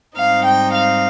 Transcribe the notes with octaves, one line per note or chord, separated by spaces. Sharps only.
G#2 G3 C4 D#4 F5
G5
F5